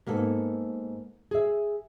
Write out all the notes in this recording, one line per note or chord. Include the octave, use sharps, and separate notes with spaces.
G#2 A#3 B3 A4
G#4 E5